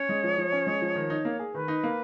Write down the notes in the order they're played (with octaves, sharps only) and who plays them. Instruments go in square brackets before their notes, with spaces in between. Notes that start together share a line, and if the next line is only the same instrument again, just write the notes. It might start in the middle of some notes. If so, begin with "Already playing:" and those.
Already playing: [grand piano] C#4 [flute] C#5
[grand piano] G#3
F3
F3
C#4
G#3
F3
D#3
D#4
A#3
G#4
[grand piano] D#3 [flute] B4
[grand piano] D#4
A#3